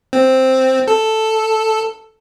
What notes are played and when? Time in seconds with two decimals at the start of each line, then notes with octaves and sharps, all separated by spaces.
0.13 C4
0.88 A4